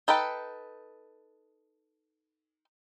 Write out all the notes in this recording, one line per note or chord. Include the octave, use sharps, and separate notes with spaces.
D#4 A4 B4 G5